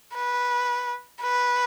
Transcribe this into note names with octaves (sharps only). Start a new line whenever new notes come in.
B4
B4